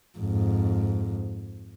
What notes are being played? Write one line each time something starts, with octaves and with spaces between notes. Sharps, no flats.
F2 G#2